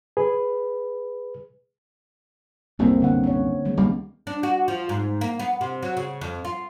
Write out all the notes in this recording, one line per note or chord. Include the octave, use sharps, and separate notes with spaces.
G#4 B4
C2 F#2 A2 A#3 C4 C#4
D3 B3 F#5
C#4 C#5
D#3 G#3 B3
C#2 G3 A#3
D4
F#4
F3
G#2
A#3
B3
C3
F#3
C#3
F2
F4